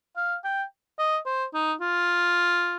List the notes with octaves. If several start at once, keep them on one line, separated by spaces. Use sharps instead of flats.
F5
G5
D#5
C5
D#4
F4